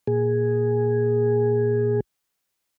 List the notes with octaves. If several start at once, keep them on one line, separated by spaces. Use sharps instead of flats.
A#2 G#4